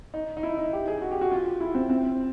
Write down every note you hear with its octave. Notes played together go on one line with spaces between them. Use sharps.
D#4
D#4
E4
D#4
G4
G#4
F#4
G4
F#4
F4
E4
C4
C4